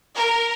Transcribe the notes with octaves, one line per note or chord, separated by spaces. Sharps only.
A#4